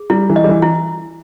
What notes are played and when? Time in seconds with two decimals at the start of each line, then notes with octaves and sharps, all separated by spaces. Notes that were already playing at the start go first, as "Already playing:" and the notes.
Already playing: G#4
0.10 G3 E4
0.30 E3
0.36 D#5
0.44 G3
0.49 E3
0.62 E4